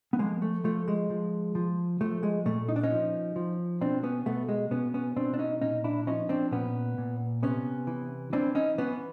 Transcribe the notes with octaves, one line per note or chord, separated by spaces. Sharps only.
B3
F3 G#3 A#3
A3
F3 A3
G#3
F3
F3
F3 A3
G#3
A#2 A3
D#4
D4
C#4 D#4
F3
F3
B2 C4 D4
B3 C#4
B2 A3 B3
G#3
B2 B3 C#4
B3 C#4
B2 C4 D4
D4
C#4 D#4
A#2 C#4 D#4
D4 E4
F3 C#4 D#4
C4 D4
A#2 B3 C#4
A#2
C3 B3 C#4
E3
E3 C4 D4
C#4 D#4
E3 B3 C#4